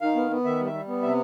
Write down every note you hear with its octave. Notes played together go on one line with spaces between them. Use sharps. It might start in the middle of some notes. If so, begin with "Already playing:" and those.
D#3 F5
B3
B3
D#3 E5
G3
E5
G3
B3
C3 E5